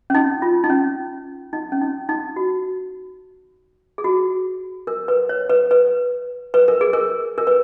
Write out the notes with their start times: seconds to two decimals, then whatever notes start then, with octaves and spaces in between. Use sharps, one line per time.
0.10 C#4
0.15 D#4
0.42 F4
0.64 D#4
0.70 C#4
1.53 D#4
1.72 C#4
1.81 D#4
2.09 D#4
2.36 F#4
3.98 G#4
4.04 F#4
4.87 A#4
5.08 B4
5.29 C#5
5.50 B4
5.71 B4
6.54 B4
6.68 A#4
6.81 G#4
6.93 A#4
7.38 A#4
7.47 B4